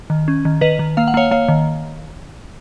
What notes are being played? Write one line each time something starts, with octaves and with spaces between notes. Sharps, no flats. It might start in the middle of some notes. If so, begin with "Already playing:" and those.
D#3
C#4
D#3
D#3 B4 D#5
D#3
A#3 F5
F#5
A#3 C#5 F5
A#3 C#5 F5
D#3